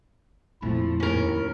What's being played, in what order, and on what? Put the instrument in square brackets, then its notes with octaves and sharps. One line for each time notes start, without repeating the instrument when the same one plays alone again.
[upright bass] F2 A#2 [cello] F3 A3 [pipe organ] E4
[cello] D#2 A2 [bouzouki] C#4 A#4